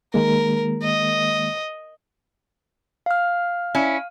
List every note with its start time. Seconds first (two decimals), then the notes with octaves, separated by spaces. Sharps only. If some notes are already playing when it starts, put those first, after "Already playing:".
0.14 D#3 G#3 A#3 A#4
0.83 D#5
3.06 F5 F6
3.75 C#4 E4